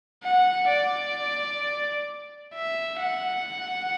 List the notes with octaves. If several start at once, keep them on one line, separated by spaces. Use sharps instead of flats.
F#5
D5
E5
F#5